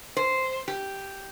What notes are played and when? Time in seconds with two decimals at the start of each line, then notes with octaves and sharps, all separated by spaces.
0.17 C5
0.68 G4